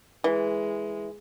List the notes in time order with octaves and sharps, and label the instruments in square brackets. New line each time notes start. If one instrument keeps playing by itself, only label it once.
[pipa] E3 [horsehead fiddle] G#3